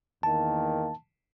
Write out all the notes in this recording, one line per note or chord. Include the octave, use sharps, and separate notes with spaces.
E2 D#3 A#3 A5